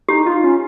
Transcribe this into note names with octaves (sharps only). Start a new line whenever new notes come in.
D#4 G4
F4
C#4